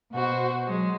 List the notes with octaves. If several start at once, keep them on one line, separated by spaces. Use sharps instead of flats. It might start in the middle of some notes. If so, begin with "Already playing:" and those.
B2 F#4 C5
F#3 G#3